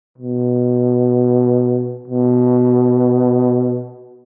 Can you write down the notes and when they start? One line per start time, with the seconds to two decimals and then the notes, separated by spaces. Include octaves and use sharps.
0.18 B2
2.08 B2